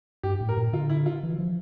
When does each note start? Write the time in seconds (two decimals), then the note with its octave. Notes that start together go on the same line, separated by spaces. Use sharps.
0.23 G2 G4
0.41 A2
0.49 A#4
0.57 A#2
0.73 D3 F4
0.89 E4
1.06 F4
1.23 E3
1.38 F3